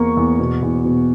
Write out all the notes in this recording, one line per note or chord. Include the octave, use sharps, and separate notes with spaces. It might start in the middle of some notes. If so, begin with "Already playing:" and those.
Already playing: E2 A#3 C#6
E2
B2
E2
B2